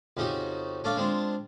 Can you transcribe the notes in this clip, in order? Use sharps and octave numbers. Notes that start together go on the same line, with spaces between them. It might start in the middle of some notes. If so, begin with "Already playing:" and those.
F2 C#3 C#4 D#4 F#4 G4
C#4 D4 A4 D5 F5
G#3 C4 D4 F4